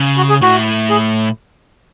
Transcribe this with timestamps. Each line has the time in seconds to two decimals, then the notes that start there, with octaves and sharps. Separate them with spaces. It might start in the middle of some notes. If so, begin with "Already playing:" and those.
Already playing: C#3
0.17 F#4
0.29 G#4
0.42 A2 F#4
0.90 G#4